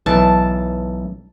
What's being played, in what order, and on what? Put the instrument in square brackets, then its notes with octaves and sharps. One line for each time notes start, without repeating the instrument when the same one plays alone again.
[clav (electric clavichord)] B1 E3 [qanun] A5